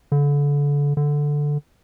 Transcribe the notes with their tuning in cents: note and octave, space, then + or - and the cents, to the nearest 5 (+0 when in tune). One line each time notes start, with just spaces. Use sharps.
D3 -30
D3 +0